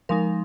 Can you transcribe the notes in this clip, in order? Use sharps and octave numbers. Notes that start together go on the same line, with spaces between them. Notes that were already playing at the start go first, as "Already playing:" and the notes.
F3 G#3 D#4 A#4